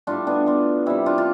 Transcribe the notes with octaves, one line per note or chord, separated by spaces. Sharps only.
A2 G3 D4 F4
B3 D4
D4 F4
C3 G3 E4 G4
D4 F4
F4